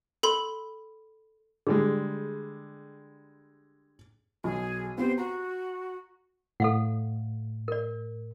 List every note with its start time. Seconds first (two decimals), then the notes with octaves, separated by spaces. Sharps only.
0.23 A4 B5 C6
1.67 D3 G3 G#3 G#4
4.44 B1 G#4
4.98 B3 C4 G4 C5
5.18 F#4 A#5
6.60 A2 A4 F5 F#5
7.68 A#4 D5